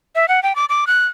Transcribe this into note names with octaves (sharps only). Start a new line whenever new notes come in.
E5
F#5
G5
D6
D6
F#6